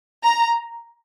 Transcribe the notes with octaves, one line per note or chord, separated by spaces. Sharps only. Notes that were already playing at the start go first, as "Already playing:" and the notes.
A#5